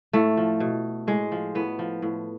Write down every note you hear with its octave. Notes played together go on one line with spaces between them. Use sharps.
A2 A3
F3
B2
A2 G#3
F3
A2 B3
F3
A2